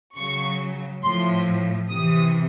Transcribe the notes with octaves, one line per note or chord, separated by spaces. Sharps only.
C#3 F#3 C#6
A2 F3 C6
C3 E3 D#6